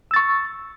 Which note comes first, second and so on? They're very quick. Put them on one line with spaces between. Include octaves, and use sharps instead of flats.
E6 A6 C#6